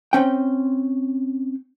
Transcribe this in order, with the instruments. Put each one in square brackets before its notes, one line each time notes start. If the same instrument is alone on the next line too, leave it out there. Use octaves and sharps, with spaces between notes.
[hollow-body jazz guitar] C4 C#4 G5